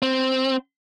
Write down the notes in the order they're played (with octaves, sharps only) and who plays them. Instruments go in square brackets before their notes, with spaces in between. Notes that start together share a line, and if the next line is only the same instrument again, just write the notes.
[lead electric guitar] C4